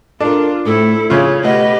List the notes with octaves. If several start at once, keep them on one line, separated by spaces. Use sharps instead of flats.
D4 F4 A4 A#4
A2 A3 C4 E4 A4
C#3 F4 C#5 E5
B2 A3 G4 B4 D#5 F#5